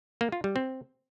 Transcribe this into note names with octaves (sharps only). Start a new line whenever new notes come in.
A#3
F4
G3
C4